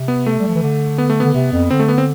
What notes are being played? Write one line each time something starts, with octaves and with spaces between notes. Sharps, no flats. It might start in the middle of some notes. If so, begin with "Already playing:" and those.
Already playing: C3
B3
A3
G3
F3
E3
D3
B3
A3
D3 B3
C3
F2
D3 C4
A3
B3
C4